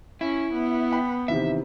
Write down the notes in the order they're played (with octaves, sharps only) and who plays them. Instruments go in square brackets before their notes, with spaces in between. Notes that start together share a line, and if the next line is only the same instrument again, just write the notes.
[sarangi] C#4 [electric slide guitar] E4
[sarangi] B3
[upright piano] G5 B5
[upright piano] C3 D#3 E3 [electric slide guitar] E5